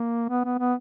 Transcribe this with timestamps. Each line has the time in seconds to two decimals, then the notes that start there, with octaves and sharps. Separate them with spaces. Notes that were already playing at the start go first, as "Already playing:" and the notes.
Already playing: A#3
0.29 B3
0.44 B3
0.59 B3